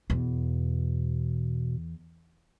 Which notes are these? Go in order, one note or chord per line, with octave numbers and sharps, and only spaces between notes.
E2 B2